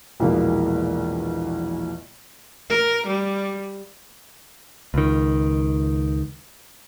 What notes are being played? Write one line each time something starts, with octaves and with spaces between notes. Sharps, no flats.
A#1 E2 B2 E3 G#3 A#3
A#4
G3
C#2 D#3